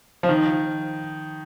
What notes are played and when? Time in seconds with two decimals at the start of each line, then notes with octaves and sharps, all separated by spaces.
0.23 F3
0.29 D#3